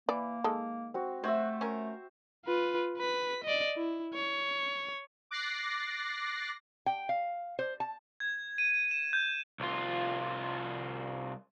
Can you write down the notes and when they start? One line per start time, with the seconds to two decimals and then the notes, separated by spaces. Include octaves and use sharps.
0.09 E3 A#3 D5
0.44 D#3 G#3 A4
0.94 C4 F#4
1.24 F#3 A3 F#4 C5 E5
1.61 C#4 A#4
2.46 F4 B4
2.97 B4 B6
3.44 D5 D#5
3.77 E4
4.14 C#5
5.31 D6 F#6 A6 A#6 C7
6.86 G5
7.09 F5
7.59 C5
7.80 A5
8.20 G#6
8.58 D#7
8.91 E7
9.13 G6
9.60 C2 F4